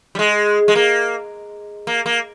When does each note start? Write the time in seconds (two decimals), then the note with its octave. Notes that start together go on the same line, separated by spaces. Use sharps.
0.15 G3
0.19 G#3
0.68 G#3
0.75 A#3
1.87 A#3
2.06 A#3